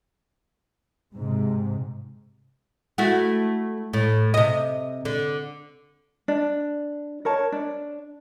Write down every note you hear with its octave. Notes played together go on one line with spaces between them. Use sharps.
G#2 C3
A3 E4 F#4
A2
C3 D#5
D3
D4
A#4 C#5 A5
D4